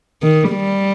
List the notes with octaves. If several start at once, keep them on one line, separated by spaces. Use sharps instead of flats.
D#3
G3